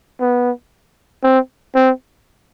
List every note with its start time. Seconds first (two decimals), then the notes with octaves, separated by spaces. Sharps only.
0.20 B3
1.23 C4
1.75 C4